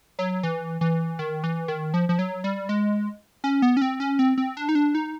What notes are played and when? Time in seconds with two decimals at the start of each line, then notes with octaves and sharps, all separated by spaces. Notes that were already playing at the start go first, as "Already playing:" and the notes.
0.19 F#3
0.43 E3
0.81 E3
1.19 D#3
1.44 E3
1.68 D#3
1.94 F3
2.09 F3
2.19 F#3
2.44 G3
2.69 G#3
3.44 C#4
3.62 B3
3.77 C#4
3.82 C4
4.00 C#4
4.19 C4
4.38 C4
4.57 D4
4.69 D#4
4.75 D4
4.95 D#4